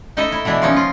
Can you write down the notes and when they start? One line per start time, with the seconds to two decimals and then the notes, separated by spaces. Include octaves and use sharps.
0.17 A3 D#4 E4 A4 D#5 E5
0.32 E4
0.45 B2 E3 D4 E4
0.62 F3 A#3 C#4 D#4
0.76 F4